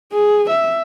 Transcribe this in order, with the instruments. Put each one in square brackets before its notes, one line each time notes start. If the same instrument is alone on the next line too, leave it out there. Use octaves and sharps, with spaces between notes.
[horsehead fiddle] G#4
E5